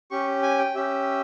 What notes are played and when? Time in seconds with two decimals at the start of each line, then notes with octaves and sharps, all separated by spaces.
0.11 C#4 G4 C#6
0.42 G#5
0.58 G5
0.75 C#4 G4 E5